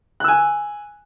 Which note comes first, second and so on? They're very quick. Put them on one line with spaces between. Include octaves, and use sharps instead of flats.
F#6 E6 G#5